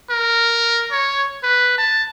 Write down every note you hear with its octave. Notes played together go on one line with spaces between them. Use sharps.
A#4
C#5
B4
A5